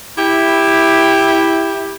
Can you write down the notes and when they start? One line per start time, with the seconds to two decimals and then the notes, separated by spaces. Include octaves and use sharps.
0.18 E4 G4